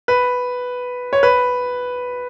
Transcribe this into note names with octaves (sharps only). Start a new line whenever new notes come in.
B4
C#5
B4